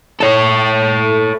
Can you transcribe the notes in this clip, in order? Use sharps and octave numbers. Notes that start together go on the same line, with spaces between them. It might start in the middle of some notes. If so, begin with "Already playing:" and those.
A4 C#5